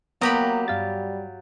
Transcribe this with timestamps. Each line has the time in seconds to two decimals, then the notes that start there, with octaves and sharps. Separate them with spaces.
0.21 F#3 A#3 B3 G4 B5 D#6 A#6
0.68 G2 G3 F5 A6